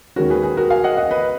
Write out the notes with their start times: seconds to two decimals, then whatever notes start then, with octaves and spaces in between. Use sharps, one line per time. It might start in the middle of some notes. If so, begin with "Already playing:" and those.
0.16 D#2 D#3 G#3 C#4 F#4 A#4
0.30 G#4 B4
0.43 G#4
0.57 F#4 A#4
0.70 F5 G#5
0.84 D#5 F#5
0.97 D#5 F#5
1.11 B4 D#5